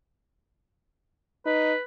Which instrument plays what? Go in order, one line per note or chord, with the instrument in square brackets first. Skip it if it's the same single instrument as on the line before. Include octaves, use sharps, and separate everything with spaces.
[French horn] D#4 [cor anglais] B4